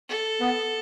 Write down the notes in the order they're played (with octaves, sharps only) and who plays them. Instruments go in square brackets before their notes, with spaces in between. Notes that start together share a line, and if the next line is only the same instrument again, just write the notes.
[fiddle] A4
[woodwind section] B3